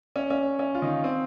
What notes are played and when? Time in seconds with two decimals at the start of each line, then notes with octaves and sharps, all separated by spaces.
0.16 C#4
0.30 C#4
0.59 C#4
0.75 F4
0.82 D#3 D#4
1.04 C4